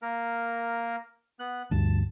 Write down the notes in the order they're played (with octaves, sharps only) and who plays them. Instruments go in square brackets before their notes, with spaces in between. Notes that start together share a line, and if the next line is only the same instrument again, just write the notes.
[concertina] A#3 A#4
B3 F#6
[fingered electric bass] D2 G2 [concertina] A5